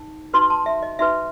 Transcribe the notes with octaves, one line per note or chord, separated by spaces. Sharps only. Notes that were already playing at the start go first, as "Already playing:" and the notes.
Already playing: D#4
D#4 F#4 B4 C6
A5
E5
D#5
D#4 F#4 B4 E5